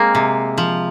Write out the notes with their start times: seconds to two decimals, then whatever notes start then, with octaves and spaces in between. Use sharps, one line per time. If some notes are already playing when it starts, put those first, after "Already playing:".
Already playing: G#3 A#3 C4
0.15 C3
0.58 F3